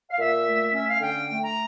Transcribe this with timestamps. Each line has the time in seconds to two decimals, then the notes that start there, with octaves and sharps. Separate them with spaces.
0.11 F5
0.19 A#2 E5
0.47 A3
0.74 C#4 E5
0.87 F5
1.01 D3 G5
1.29 A3
1.42 A#5